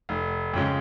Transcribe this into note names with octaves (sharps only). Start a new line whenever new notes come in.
F1
F2 C#3 G#3